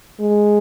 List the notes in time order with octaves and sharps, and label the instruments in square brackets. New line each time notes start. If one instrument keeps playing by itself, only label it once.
[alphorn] G#3